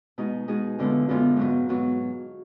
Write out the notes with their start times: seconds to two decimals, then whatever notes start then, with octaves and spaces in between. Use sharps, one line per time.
0.18 B2 G#3 D#4 G#4
0.48 B2 G#3 D#4 G#4
0.79 F#2 D3 G#3 B3 F4
1.09 F#2 D3 G#3 B3 F4
1.37 G#2 F#3 B3
1.69 G#2 F#3 B3